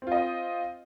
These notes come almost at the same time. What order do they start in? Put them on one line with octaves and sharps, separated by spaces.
C4 F4 D#5